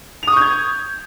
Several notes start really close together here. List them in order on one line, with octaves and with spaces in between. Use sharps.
F7 D#6 C#6 G6 G#6